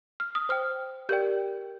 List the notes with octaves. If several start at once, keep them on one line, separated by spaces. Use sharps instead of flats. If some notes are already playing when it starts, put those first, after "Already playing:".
F6
D#6
C5 G5 F6
G4 A#4 D5 G5 G6